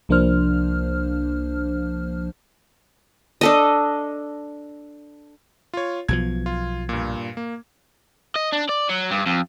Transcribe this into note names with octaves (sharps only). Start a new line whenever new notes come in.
C2 F3 A#3 D4 C5 F6
D4 A4 D#5
F4 C#5
B1 B2 F3 G#6
F4
G2 A#2
A#3
D#5
D4
D5
F#3
G2
F2